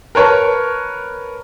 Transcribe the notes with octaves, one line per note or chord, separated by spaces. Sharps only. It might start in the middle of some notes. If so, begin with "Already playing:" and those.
A#4 B4 C#5 A5